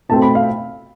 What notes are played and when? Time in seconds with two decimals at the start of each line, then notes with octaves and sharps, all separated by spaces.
0.09 B2 A3 C4 A5
0.22 B5
0.35 F5